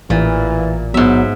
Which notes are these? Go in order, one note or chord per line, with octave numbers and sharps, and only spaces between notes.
A1 A#2 E3
G#2 F#3 B3 E5